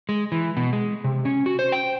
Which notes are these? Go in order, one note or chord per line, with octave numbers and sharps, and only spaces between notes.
G#3
E3
B2
G#3
C3
C#4
F#4
C5
G5